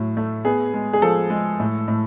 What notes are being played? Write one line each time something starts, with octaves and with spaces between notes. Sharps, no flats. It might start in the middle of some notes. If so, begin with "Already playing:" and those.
Already playing: A2 F#3
A3
B3 G#4
G#3
G#4
F3 A4
G#3
A2
A2